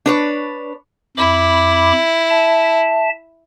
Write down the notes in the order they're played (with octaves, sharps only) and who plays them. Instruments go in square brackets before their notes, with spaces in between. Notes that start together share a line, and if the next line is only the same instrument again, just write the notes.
[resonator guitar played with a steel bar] D4 B4 C#5
[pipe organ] F2 B5 D6 [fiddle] E4
[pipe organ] E5 A5